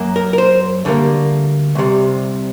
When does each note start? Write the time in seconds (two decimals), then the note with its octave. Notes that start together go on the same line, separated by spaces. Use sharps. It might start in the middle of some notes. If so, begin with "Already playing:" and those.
Already playing: F#2 F#3 A#3
0.16 A#4
0.33 A#4
0.38 C5
0.85 D2 D3 G3 A#3
1.75 C2 C3 G3